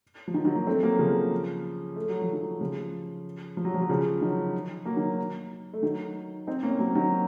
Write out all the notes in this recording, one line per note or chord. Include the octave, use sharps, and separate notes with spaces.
F3
D#3 F#3
D#3 F#3
F#3 A#3
A3 C4
F#3 A#3
C#3 F3
A3
F#3
F3
D#3 F#3
C#3 F3
F3
F#3
F3
F#3
C#3 F3
D#3 F#3
F#3 A#3
D#3 F#3
A3
D#3 F#3
C4 D#4
A#3 C#4
C4
F#3 A#3
D#3 F#3